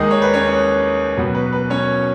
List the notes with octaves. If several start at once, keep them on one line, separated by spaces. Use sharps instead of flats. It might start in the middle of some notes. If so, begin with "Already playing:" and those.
Already playing: D#2 D#3 G#3 D#4 D#5
C#5
B4
C#4 C#5
B2 F#3 B3
B4
B4
C#4 C#5